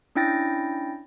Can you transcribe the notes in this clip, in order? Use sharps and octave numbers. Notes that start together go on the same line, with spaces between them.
C#4 D4 E4 G5 A6 A#6